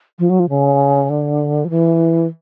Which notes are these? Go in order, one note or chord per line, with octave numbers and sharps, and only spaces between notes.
F3
F#3
F3
C#3
D3
F3
E3